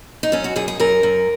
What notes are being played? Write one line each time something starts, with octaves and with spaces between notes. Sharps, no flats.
D#4
F#2 C#4
F#4
F#2 G#4
G#4
F#2 A#4
F#2